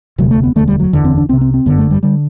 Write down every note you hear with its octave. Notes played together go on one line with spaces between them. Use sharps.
E1 D2 C3 F#3
A3
B3
E1 D2 D3 A3
G3
F#3
F#1 E2 D3 E3
C4
D4
C2 C3 C4
C4
C4
G1 F#2 D3 B3
A3
G3
D3 G3